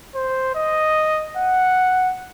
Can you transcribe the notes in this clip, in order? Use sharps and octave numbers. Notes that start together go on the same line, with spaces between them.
C5
D#5
F#5